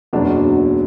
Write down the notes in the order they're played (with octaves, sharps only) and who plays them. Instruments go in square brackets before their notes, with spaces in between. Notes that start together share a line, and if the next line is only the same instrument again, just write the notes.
[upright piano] F#1 E2 B2 F#3 D4